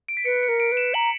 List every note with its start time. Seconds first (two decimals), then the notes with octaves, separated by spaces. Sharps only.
0.09 D7
0.17 B6
0.25 B4 C#7
0.43 C#7
0.48 A#4
0.60 D7
0.72 B4
0.77 E7
0.94 A#5 F#7